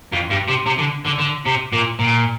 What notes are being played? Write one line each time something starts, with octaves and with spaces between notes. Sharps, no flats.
F2
G2
C3
C3
D3
D3
D3
C3
A#2
A#2